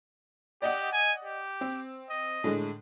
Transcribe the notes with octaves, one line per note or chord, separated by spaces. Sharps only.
G4 D5 D#5 F#5
G#5
G4
C4
D#5
A2 D3 G#3